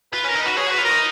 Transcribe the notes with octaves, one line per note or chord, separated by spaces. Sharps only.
F4 B4
C#4
A#4
D#4
F#4 B4
G#4 C#5
F#4 B4
F4
D#4 A#4